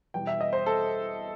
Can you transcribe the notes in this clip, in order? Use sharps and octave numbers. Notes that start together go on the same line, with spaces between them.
E2 B2 G3 G5
E5
D#5
C5
A4